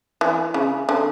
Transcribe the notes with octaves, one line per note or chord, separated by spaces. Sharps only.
E3
C#3
D3